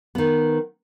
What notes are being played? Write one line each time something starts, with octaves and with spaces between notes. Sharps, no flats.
D#3 B3